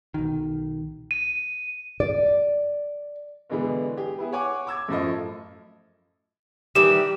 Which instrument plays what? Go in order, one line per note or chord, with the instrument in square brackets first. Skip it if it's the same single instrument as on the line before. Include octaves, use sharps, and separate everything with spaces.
[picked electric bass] B1 D#3
[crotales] D#7
[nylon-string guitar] D5
[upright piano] B2 D3 E3 G#3 B3
G4 G#4
B3 E4 G#4
C#5 F#5 G#5 D6
D6 E6 G#6
F#2 A2 F3 A4 D#5
[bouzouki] D#3 E3 G3 [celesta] E7